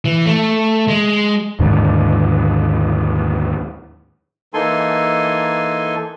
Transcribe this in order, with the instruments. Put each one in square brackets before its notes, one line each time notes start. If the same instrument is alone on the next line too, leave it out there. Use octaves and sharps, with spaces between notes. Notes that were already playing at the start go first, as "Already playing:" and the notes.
[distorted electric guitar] E3
A3
G#3
[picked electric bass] D#2 G#2 D3
[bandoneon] E3 A#3 D#4 A4 G#5 C6